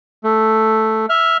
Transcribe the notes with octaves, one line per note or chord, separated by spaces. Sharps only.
A3
E5 F6